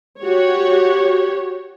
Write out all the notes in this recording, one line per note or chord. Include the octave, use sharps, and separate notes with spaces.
F#4 G4 C#5